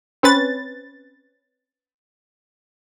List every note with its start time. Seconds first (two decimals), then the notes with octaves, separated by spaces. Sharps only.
0.23 C4 C#4 B4 A6